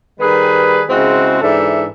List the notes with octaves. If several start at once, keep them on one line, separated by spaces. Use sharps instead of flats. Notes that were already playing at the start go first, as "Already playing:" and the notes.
D#3 G3 G#4 B4
C#3 G#3 C4 E4 F#4
G#2 E3 D4 A4 E5